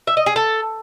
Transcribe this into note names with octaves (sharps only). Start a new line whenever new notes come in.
E5
D#5
G#4
A4